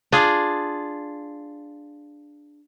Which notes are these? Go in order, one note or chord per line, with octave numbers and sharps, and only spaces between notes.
D4 F4 G#4